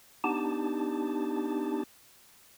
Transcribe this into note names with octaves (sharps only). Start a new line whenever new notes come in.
B3 D4 D#4 G4 A5